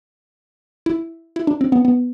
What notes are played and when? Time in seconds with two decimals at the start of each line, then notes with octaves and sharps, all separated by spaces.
0.86 E4
1.36 E4
1.47 D4
1.61 C4
1.72 B3
1.85 B3